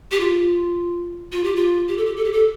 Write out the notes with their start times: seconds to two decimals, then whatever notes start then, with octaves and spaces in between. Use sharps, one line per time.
0.11 G4
0.20 F4
1.32 F4
1.44 G4
1.56 F4
1.88 G4
1.97 A4
2.06 G4
2.16 A4
2.24 G4
2.33 A4